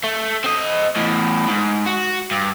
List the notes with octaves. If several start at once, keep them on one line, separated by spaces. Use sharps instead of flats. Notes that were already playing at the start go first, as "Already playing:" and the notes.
A3
C4 D#5
E2 A2
G#2
F#4
G2